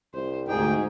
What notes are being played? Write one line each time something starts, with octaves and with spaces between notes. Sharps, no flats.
C2 C5
D2 G#2 D#4 G#4 G5